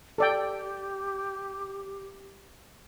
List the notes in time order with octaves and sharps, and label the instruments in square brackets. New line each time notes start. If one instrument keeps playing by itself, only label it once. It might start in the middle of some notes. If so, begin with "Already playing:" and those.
[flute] G4 [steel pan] A4 D5 G5